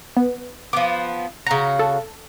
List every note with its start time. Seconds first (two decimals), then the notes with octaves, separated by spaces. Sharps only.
0.17 B3
0.73 F3 B3 D6
1.47 C#3 F#4 A#5
1.79 A4